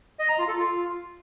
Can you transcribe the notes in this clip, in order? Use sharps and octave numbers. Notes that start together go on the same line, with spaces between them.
D#5
A#5
F4
A4
F4